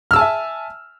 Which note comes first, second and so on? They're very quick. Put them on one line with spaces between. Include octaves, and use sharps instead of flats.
F6 E6 A5 G#5 E5